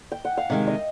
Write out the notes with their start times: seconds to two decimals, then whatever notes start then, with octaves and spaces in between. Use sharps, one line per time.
0.12 G5
0.25 F#5
0.37 F5
0.50 C3 D#3 G#3 E5
0.67 D#5